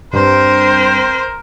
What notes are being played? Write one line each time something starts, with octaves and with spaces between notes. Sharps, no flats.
G2 C4 A#4 C5